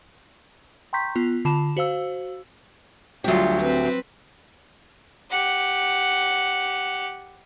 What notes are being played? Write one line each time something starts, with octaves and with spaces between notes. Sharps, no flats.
G5 A#5 C6 C#6 G6 B6
B3 F4
D3 F4 A5 B5 E7
F#4 C5 F5 E6
D2 F#3 G3 F4 G4
C4 B4
G4 F#5